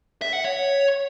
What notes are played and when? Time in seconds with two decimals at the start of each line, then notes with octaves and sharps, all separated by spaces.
0.22 E5
0.33 F#5
0.44 C#5